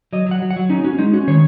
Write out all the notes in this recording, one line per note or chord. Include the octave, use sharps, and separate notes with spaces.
F#3 D#5
F#3 F#5
F#3
F#5
F#3
C#4 D#4
C#4 F#4
G#3 D#4
C#4 F#4
D#3 C#5